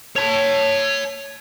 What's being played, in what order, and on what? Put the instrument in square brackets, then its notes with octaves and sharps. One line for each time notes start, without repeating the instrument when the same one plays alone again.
[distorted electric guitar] C#5 A5